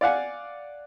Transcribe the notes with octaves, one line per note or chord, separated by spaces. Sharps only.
D5 F5 F#5 G#5